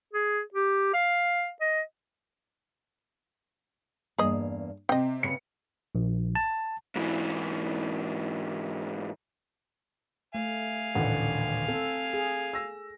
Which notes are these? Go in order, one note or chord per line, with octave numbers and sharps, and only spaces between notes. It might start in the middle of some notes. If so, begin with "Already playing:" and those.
G#4
G4
F5
D#5
E2 G2 A#3 G#4 D#5
C3 C4 C5 D#5 G5
C#3 C4 B4 C#7
A#1
A5
G#2 E3
A3 F5 G#5
D#1 A1 D3 F#5
C4 A4
G#4
E6 A#6